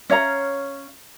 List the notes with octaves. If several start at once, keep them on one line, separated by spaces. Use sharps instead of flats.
C#4 C#5 F5 A#5